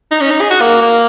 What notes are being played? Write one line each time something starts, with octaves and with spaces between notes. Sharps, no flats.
D#4
C#4
D#4
G#4
F#4
A#3
A#3